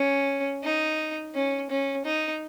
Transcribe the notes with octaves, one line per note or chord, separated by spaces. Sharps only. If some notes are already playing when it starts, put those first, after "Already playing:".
Already playing: C#4
D#4
C#4
C#4
D#4